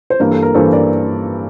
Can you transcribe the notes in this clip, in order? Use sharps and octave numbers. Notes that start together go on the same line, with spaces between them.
C5
G2 E3 A#3 A#4
A4
A#4
G2 E3 A#3 A4 C5
A#4 D5